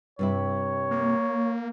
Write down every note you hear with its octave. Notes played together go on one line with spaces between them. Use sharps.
G2 C3 E4 C#5
A#3